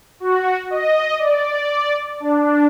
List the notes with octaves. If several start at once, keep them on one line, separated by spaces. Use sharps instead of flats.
F#4
D#5
D5
D4